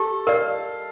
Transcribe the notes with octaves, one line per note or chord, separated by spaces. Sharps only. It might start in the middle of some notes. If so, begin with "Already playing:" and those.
Already playing: G4 A4
A#4 D5 F5